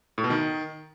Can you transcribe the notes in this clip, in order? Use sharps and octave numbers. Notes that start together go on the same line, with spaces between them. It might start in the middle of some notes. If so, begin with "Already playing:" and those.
A2
B2
D#3